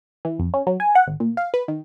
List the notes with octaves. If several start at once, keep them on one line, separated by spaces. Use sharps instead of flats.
E3
F2
C#4
F#3
G#5
F#5
G#1
A#2
F5
B4
D#3